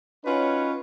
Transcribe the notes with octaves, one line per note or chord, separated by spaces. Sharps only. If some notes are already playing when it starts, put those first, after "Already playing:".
C#4 D#4 F4 F#4 B4 C#5